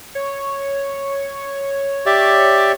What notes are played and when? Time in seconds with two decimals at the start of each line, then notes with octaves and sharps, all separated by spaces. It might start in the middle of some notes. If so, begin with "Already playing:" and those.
0.15 C#5
2.06 G4 D5 E5